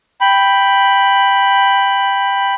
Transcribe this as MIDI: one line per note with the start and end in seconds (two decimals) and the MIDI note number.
0.21 2.55 79
0.21 2.55 83